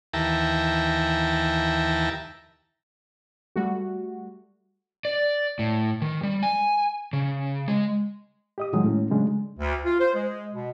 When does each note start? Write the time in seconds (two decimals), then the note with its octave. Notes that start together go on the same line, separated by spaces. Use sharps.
0.14 D#2 E3 E5 G5 A5 A#5
3.56 G3 A3 F#4
5.05 D5
5.59 A2
6.02 D#3
6.23 G3
6.43 G#5
7.13 C#3
7.68 G#3
8.58 G4 D#5 D#6
8.73 A2 D#3 F3 F#3 G#3
8.85 A2 C#4
9.10 C#3 F#3 G#3 A3 D4
9.58 D2
9.84 F4
10.00 C5
10.14 G#3
10.53 B2